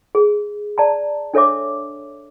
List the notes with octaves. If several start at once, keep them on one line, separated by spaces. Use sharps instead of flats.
G#4
D5 A5 A#5
D4 A4 C#5 E5 D6